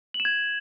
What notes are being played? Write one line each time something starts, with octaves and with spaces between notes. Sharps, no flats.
F#7
E7
G#6